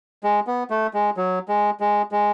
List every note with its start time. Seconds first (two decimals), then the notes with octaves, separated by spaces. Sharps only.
0.24 G#3
0.47 B3
0.70 A3
0.94 G#3
1.17 F#3
1.49 G#3
1.80 G#3
2.12 G#3